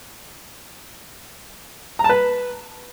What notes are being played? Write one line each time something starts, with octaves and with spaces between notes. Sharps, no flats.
A#5
A5
B4